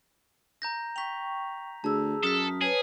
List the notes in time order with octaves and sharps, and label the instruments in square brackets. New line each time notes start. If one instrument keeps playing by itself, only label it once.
[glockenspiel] A#5 G6 A#6
[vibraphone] G5 C#6 [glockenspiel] B6 F7
[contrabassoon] D2 [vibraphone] G#4 E6 [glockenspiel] A5
[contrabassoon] F#2 [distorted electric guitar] A4 [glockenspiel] D#6 F6 B6
[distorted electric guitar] G#4 [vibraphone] B4 C#5